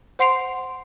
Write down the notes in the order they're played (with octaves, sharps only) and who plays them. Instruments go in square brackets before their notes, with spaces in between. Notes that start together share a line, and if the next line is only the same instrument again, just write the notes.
[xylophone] C5 F#5 C6 C7 D7 F7